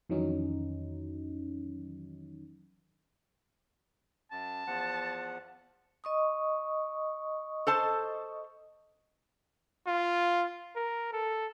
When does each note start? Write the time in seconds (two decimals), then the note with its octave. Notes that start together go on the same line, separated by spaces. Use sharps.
0.09 F2 D#3 E3 F#3 C#4 D#4
4.31 F#2 A5
4.67 E2 F3 F#5
6.04 D#5 C#6 D#6
7.67 A4 C5 A5
9.87 F4
10.76 A#4
11.13 A4